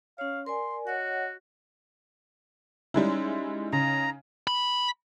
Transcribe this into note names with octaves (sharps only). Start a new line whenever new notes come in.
C#4 C#5 F5
A#4 D5 G#5 C6
F#4 C#5 D#5 F#5
G3 G#3 C#4 D#4 E4
C#3 A#5
B5